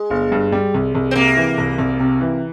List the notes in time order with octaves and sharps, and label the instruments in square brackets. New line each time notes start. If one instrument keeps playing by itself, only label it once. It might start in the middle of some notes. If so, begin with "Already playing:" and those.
Already playing: [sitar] G#3
[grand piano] G1
G2
G3
C2
C2
[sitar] C4
[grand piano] C3 [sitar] A#3
[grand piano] E3
C2
C2
C3
E3